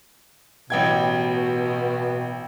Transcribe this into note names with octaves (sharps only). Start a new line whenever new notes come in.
A1 B2 G5 G#6